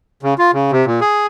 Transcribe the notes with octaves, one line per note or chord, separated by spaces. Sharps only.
C#3
F4
C#3
C3
A#2
G#4